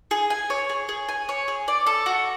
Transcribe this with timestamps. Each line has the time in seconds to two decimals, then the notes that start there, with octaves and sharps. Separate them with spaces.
0.11 G#4
0.30 G#5
0.50 C#5
0.69 G#4
0.89 G#4
1.09 G#5
1.29 C#5
1.48 G#4
1.68 D5
1.86 A4
2.06 F#4